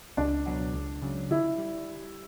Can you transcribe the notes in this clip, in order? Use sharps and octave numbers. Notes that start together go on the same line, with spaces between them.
C#2 D4
B2 F#3 B3
C#2
C#3 F#3
D3 E4
G3